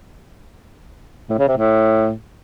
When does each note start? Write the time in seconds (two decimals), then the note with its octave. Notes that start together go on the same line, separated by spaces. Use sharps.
1.29 A2
1.39 C#3
1.48 C3
1.57 A2